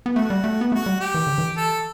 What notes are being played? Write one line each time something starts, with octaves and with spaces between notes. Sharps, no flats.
B3
A3 F#4
G3
A3
B3
A3 F#4
G3
G4
E3
D3
E3
A4